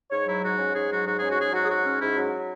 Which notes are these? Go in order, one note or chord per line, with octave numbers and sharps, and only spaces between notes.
G#2 C#5
F#3 E4
G#2 F#4
C#4
G#2 G#4
F#3 F#4
G#2 F#4
C#4 G#4
F#4
G#2 G#4
F#3 F#4
G#4
G#2 F#4
C#4
G#2 E4
F#3